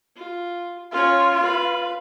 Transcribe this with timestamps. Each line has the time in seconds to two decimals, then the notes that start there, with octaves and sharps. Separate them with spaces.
0.16 F4
0.92 C#4 F4 C#5
1.42 B4 F5